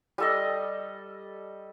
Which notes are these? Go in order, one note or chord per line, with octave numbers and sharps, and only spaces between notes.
G3 A4 D#5